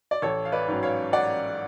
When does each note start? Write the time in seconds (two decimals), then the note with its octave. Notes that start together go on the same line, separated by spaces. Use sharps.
0.11 D5
0.22 A1 A4 C#5
0.45 F5
0.52 B4 D5
0.68 G#2 F#3 C#4
0.83 C#5 F5
1.13 D5 F#5